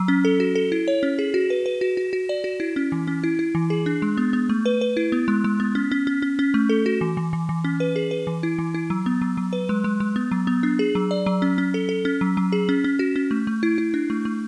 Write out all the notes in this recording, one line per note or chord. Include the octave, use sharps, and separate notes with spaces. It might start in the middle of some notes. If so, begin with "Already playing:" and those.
Already playing: F#3
C#4
A4
F#4
A4
E4
C#5
C#4
G#4
F#4
B4
B4
F#4
F#4
F#4
D5
F#4
E4
C#4
E3
C#4
E4
E4
E3
G#4
D4
G#3
B3
B3
A3
B4
B4
E4
B3
G#3
G#3
B3
C#4
C#4
C#4
C#4
C#4
A3
A4
F#4
E3
E3
E3
E3
C#4
B4
G#4
B4
E3
E4
E3
E4
F#3
B3
F#3
F#3
B4
G#3
G#3
G#3
B3
F#3
B3
D4
G#4
F#3
D5
F#3
C#4
C#4
A4
A4
C#4
F#3
F#3
G#4
C#4
C#4
F#4
C#4
A3
A3
E4
E4
D4
A3
A3